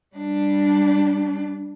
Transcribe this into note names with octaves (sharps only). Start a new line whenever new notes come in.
G3 D4